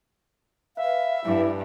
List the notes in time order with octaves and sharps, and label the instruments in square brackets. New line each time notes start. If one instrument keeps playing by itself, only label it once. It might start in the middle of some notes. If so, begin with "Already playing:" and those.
[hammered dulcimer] B4 [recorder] E5 [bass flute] F5
[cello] G2 [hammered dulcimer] E3 D4 A4 [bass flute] E4